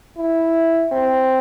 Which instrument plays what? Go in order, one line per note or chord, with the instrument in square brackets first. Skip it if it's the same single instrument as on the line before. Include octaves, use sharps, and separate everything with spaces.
[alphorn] E4
C4